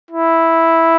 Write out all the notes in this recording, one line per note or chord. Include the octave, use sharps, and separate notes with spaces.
E4